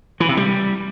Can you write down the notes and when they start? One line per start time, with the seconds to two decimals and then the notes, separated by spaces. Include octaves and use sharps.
0.20 E3
0.29 C3
0.37 G3